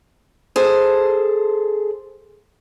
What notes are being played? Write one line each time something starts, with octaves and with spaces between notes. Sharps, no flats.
G#4 A4 C5